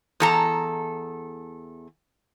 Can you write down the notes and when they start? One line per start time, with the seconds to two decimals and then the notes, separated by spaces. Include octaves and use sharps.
0.20 E2 A4 A#5